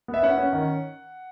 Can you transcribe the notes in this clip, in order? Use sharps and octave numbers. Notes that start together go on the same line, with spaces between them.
B3
E5
C#4 F#5
C#4
D#3